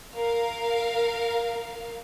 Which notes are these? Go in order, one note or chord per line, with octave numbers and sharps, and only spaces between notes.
A#4 F5